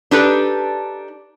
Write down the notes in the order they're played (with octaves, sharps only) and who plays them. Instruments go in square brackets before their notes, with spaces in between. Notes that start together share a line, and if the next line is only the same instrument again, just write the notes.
[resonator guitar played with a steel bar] D4 D#4 G4 A4 B4 D5